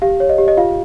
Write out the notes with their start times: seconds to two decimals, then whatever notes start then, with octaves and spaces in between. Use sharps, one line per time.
0.02 G4 F5
0.20 C#5
0.29 D#5
0.38 G4
0.48 D#5
0.57 F4 F5